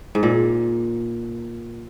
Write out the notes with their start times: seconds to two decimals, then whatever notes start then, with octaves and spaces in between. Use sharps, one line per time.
0.15 G#2
0.23 A#2